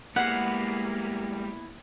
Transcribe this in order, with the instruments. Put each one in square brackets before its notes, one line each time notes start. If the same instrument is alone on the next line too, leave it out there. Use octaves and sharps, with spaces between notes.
[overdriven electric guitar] G3 G#3 [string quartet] A#3 [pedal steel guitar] B3 E4 F5 [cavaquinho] F#5